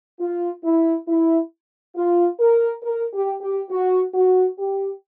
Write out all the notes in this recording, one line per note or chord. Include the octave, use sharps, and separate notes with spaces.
F4
E4
E4
F4
A#4
A#4
G4
G4
F#4
F#4
G4